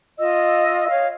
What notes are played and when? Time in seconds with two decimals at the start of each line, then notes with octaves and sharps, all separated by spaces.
0.19 F4 D#5 E6
0.89 C#5 F5